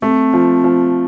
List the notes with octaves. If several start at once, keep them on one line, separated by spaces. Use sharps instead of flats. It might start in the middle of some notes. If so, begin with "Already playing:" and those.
A3 C4
F3
F3